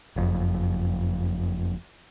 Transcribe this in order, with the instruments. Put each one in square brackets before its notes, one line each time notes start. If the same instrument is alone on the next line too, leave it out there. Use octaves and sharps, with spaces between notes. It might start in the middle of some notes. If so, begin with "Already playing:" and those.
[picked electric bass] F#1 F2